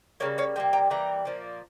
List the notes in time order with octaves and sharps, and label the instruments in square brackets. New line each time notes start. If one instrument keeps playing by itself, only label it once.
[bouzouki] C#3 G3 A#3 A#4 C#5
C#5 F5
C3 G3 A#3 G5
G5 A#5
E3 G3 A#3 G5 A#5
A#2 F3 A#3